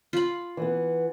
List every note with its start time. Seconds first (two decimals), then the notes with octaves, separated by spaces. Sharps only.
0.13 F4 B5
0.57 E3 B3